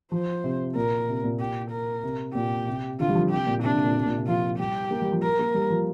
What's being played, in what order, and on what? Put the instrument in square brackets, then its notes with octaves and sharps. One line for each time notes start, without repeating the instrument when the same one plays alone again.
[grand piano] F3 [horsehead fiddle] C5
[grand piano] C3
[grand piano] A#2 [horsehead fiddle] A#4
[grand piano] C3
A#2
[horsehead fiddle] G4
A#4
[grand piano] C3
[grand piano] A#2 [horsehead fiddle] G4
[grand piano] C3
[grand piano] D3 [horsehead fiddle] F4
[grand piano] G3
F3
[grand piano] C3 [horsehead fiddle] G4
[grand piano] A#2
[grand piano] C3 [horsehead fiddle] D4
[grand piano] D3
A#2
C3
A#2
C3
[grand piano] F3 [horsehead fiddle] F4
[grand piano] G3 [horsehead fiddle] G4
[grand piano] A#3
G3
F3
[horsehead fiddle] A#4
[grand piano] A#3
G3
F3